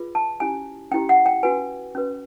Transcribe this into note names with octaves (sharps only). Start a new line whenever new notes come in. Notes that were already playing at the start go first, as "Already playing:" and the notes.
Already playing: F4 G#4 B4
A5
C#4 E4 G4 G#5
C#4 E4 G4 G5
F#5
G5
C#4 F#4 B4 G#5
C#4 F#4 B4